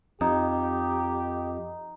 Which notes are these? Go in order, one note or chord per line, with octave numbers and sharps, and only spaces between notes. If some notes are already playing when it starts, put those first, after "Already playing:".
F2 D#4 G4